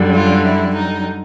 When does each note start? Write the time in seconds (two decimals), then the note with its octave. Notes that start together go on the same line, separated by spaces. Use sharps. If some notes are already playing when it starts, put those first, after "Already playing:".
Already playing: F#2 D3 G3
0.14 F4
0.44 E4
0.75 D#4